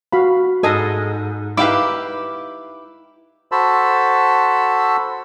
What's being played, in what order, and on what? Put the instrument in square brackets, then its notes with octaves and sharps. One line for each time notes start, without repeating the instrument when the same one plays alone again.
[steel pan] F#4 F5 B5
[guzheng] G#2 G#5 [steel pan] A4 D#5 D#6
[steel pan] D#4 F5 D6 [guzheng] E4 G4 B4
[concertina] F#4 A4 C5 A5 B5 E6